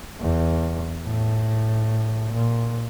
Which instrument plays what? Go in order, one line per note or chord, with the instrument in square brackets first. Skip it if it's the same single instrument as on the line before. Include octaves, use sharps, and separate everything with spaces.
[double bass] E2
A2
A#2